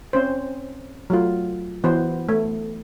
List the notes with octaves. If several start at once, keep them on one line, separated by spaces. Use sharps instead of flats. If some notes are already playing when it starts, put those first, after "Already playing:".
C4 C#4 C5
F#3 A3 F4
E3 B3 F#4 B4 C5
A3